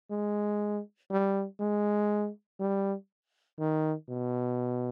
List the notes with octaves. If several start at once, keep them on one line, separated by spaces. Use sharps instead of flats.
G#3
G3
G#3
G3
D#3
B2